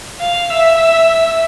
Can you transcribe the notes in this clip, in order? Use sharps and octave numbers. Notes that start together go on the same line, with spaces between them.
F5
E5